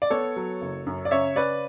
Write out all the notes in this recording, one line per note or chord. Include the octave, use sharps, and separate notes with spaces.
D5
B3 A4 C#5
F#3
F#1
F#2
D5
C#3 C#5 E5
C#4 B4 D5